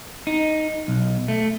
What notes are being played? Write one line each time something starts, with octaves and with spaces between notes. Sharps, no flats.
D#4
B1
A3